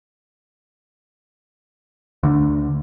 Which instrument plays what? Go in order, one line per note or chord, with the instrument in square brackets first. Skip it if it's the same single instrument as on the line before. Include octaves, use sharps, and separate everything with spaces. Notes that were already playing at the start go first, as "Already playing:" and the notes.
[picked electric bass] D2 D3